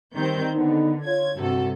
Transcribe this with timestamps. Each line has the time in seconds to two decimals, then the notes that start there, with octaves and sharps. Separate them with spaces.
0.18 D#3 G3 C4 G6
0.55 D3 B3 D#4
1.05 F4 C#5 G#6
1.38 G2 C3 F#4 A4